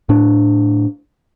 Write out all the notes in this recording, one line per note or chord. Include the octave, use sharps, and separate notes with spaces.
A2 D4